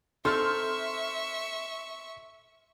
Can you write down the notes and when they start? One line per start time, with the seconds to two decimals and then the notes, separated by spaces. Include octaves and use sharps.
0.25 C4 D#4 A4 E5 C6 C#6 F6